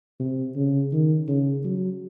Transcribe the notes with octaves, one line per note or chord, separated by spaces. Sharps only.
C3
C#3
D#3
C#3
F#3